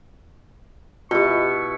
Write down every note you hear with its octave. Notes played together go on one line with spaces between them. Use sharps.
B2 E4 F4 G4 C#6